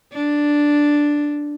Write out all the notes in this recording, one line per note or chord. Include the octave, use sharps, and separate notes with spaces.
D4